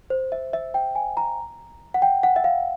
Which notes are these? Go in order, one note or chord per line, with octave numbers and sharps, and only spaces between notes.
C5
E5
E5
G5
G#5
A#5
F#5
G5
F#5
E5
F5